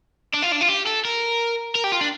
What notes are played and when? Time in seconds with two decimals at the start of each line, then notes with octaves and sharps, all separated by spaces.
0.34 D4
0.42 F4
0.52 D4
0.61 F4
0.69 G4
0.87 A4
1.05 A#4
1.75 A#4
1.84 G4
1.92 F4
2.01 D4